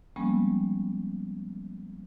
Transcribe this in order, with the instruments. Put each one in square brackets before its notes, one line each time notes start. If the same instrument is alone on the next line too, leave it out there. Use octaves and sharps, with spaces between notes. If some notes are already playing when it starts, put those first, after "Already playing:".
[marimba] F3 G3 G#3 A#3 B3 C#4